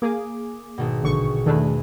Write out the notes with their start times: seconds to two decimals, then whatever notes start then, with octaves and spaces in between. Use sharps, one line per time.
0.02 A#3 G#4 D6
0.78 G#1 B2
1.02 A#1 D3 C#6
1.46 E2 D#3 A3 D4 B5